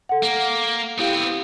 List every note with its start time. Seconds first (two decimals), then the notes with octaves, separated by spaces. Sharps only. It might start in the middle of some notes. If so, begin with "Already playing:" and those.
0.09 A4 F#5
0.23 A#3
0.99 B3 C4 E4 G4 F5